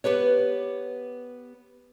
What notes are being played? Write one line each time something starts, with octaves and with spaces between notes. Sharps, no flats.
B3 G4 B4 C#5